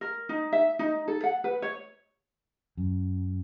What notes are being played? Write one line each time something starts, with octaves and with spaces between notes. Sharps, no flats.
A#4
D#4
E5
D#4
A4
F#5
B4
C#5
F#2